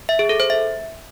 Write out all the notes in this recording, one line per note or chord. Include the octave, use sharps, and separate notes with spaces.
E5
G#4
A4
C5
E5